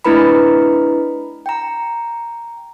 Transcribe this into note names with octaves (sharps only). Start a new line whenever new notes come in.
A3 D4 E4 B4 A#5 B5
G5 A#5